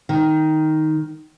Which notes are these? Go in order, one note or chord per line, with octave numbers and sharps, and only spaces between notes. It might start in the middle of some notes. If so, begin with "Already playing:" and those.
D#3